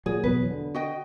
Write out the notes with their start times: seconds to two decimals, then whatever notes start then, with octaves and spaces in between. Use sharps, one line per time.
0.06 A#2 F#3 G#4
0.24 E2 B2 F#3 B4
0.50 D3
0.75 F#4 D#5 G5